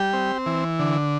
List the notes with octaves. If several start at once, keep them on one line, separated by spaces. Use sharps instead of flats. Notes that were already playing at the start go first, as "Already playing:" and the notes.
Already playing: G3 G4
C4
E3
D3